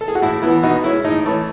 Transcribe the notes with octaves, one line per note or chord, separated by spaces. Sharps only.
A4
G#4
F#4
A2 E4
E3 B3 E4
B2 D#4 F#4
G#3 C#4 E4
A2 D#4
E3 A3 C#4